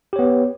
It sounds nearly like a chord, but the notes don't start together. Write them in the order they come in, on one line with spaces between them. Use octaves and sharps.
G4 C#5 B3